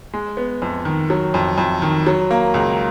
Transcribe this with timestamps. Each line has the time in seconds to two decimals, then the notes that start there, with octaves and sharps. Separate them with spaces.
0.14 G#3
0.37 B3
0.62 F2
0.85 D#3
1.10 F#3
1.34 F2
1.58 F2
1.82 D#3
2.06 F#3
2.31 A#3
2.54 C#2